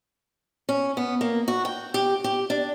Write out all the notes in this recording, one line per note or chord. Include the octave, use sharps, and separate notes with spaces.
C#4
B3
A#3
F#4
G5
G4
G4
D4